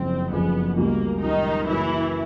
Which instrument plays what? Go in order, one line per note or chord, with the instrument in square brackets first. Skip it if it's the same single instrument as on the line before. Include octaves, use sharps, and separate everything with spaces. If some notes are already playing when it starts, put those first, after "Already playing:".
Already playing: [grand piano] F#1 F2 C#3 [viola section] C4
[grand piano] F#1 F2 C#3 [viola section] B3
[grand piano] C#2 B2 G3 [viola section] A#3
[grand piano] C#2 B2 G3 [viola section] D#3 D#4
[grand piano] F#2 C#3 F#3 A#3 C#4 [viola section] E3 E4